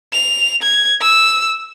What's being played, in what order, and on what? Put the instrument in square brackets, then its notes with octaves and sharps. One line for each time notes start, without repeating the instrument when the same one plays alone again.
[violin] F7
G#6
E6